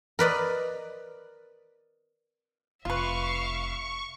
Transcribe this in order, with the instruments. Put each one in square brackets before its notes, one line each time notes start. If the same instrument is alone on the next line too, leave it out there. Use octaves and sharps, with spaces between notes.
[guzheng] A#4 B4 D5 D#5
[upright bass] F1 [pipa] F4 B4 [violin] E5 F5 [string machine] C#6